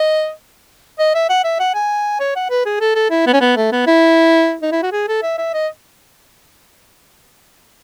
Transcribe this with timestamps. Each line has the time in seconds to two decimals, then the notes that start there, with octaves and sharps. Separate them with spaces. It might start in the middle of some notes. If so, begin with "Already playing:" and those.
Already playing: D#5
0.99 D#5
1.15 E5
1.30 F#5
1.44 E5
1.60 F#5
1.75 G#5
2.20 C#5
2.36 F#5
2.50 B4
2.66 G#4
2.80 A4
2.95 A4
3.11 E4
3.27 B3
3.33 C#4
3.41 B3
3.56 A3
3.72 B3
3.87 E4
4.62 D#4
4.72 E4
4.83 F#4
4.92 G#4
5.08 A4
5.23 E5
5.38 E5
5.54 D#5